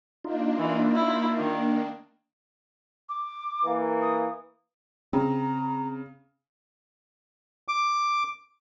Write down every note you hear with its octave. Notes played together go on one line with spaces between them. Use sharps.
A#3 D4 D#4 F4
E3
E4
D#3
D6
E3 A#3
D#6
C#3 C4 A#5
D6